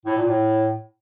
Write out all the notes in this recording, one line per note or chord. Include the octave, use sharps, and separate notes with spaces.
A2
A#2
A2